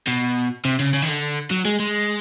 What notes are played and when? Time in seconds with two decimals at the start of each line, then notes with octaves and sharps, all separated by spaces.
0.08 B2
0.65 C3
0.79 C#3
0.94 C#3
1.02 D#3
1.08 D3
1.51 F#3
1.65 G#3
1.80 G#3